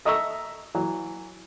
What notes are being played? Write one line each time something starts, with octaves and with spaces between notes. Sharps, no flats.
A4 D#5 E5 A#5 C#6 E6
E3 F#3